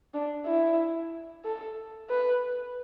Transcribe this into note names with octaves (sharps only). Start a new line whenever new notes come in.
D4
E4
A4
B4